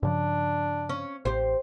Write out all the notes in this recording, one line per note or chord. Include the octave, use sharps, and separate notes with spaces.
G2 C#3 F3 D4
C#4
A1 G4 C5